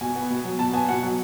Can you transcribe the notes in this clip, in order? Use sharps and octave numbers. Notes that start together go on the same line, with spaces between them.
B2 G#5
B3
B2
F#3
B2 A5
B3 G#5
B2 F#5
F#3